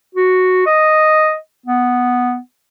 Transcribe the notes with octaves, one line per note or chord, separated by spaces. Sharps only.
F#4
D#5
B3